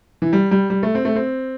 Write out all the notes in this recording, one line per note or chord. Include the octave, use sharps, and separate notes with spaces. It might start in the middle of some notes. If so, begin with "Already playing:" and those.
E3
G3
G3
G3
A3
C4
A3
C4